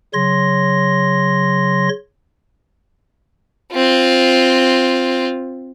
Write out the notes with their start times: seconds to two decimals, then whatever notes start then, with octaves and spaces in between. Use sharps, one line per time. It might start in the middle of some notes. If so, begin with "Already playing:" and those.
0.14 C#3 F#3 C#5 C6 A#6
3.73 C4 F4